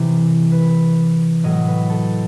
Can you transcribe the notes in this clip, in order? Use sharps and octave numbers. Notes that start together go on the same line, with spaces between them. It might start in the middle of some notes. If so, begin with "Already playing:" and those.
Already playing: C3 E3 G4
B4
A2 F#3 D#5
B4
A4